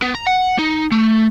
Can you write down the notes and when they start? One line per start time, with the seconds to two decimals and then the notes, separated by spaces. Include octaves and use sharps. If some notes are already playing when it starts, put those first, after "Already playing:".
0.02 B3
0.15 A#5
0.27 F#5
0.59 D#4
0.92 A3